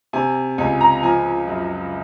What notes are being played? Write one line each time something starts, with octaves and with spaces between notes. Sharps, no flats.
C3 G#5
C#2 G#5
A#5
F3 G#5
F#2